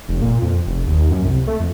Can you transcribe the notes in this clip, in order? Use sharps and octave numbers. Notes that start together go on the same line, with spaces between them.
F1
A#2
F2
F1
D#2
F#2
C2
A3
F2